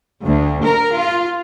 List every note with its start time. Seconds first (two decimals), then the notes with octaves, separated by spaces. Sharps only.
0.24 D2
0.66 A#4
0.96 F4